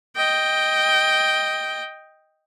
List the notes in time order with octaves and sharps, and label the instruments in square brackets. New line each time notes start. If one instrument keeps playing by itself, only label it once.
[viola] D#5 G5